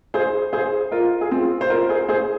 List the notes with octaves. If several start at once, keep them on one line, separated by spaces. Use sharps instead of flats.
G#4 C5
G#4 C5
F4 A#4
G#4
C4 F4
C5
F4 A#4
G#4 C5
G#4 C5